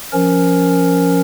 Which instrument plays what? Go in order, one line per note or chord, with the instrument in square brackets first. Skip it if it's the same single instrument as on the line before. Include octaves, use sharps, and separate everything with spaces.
[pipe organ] F3 C#4 A#4